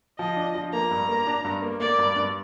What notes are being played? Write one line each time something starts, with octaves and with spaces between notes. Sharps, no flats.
F3 D#5
D4
F3
A#3 A#5
G2
A#3
D4
G2
A#3
A#3 D5
G2
G2